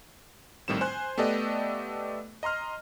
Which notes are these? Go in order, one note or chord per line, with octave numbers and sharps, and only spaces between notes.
A#1 A2 D#3 G3 C4 E7
C5 G#5 C6 F#6
A3 B3 G4 A4 D5 D#5
D#5 A#5 C6 F6